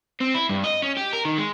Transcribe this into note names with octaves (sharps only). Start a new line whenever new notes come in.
C4
E4
G2
D#5
C#4
G4
A#4
D#3
G#3